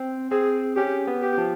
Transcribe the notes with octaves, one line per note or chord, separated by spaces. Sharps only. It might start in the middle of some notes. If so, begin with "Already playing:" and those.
Already playing: C4
C4 G#4
C#4 G4
B3
G4
F3